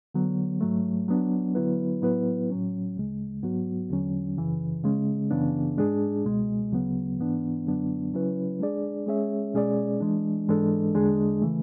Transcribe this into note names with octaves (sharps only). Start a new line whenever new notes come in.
D3 F#3 B3
G#2 F#3 A3
F#3 B3 D4
D3 F#3 B3 E4 B4
A2 F#3 B3 E4 B4
A2 F#3 C#4
D2 C#3 G#3
G#2 F#3 B3 F#4
E2 D3 F#3 C#4
F#2 C#3 E3
C#3 G#3 C#4
F#2 C#3 E3 B3 D4
G#2 G#3 D4 G#4
C#2 B2 G#3
D2 C#3 F#3 B3
G#2 E3 B3 D4
F#2 D3 F#3 B3 D4
C#3 F#3 C#4 E4 B4
G#3 D4 G#4 D5
G#3 C#4 G#4 C#5 E5
B2 G#3 C#4 G#4 D5
E3 G#3 D4
G#2 E3 G#3 D4 A4
E2 D3 G#3 D4 G#4
C#3 E3 A3